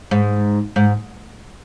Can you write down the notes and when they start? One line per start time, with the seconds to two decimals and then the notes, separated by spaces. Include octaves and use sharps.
0.11 G#2
0.76 G#2